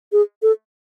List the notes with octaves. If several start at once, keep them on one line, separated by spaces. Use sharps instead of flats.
G#4
A4